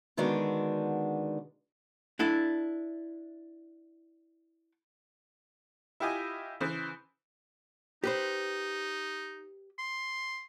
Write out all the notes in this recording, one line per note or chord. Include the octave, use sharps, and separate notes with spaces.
D3 D#3 G#3 B3 D4 F#4
D4 E4 A4
E4 F4 G4 D#5 G#5
C#3 E3 C5
D#4 G4 B4 C5
C6